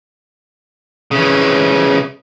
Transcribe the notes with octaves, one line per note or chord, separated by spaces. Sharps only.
C#3 E3